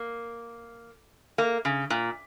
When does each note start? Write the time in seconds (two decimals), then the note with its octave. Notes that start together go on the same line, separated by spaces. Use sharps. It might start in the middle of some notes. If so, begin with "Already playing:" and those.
Already playing: A#3
1.38 A#3
1.65 C#3
1.90 A#2